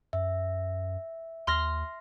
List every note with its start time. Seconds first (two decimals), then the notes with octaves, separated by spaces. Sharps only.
0.13 F#2 E5
1.47 D#2 C6 F6 A#6